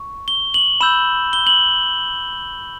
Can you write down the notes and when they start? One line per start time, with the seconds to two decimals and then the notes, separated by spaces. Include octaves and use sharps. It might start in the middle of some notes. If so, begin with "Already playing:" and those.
Already playing: C#6
0.28 G7
0.54 F#7
0.81 B5 E6 G6 E7
1.33 G7
1.47 F#7